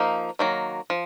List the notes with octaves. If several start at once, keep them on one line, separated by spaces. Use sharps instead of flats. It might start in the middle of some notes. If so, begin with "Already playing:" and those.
Already playing: F3 A#3 D#4
D#3 F#3 A#3
F3